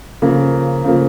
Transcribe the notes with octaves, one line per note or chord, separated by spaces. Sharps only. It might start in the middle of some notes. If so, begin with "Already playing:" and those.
C#3 F3 A#3
C#3 F3 A#3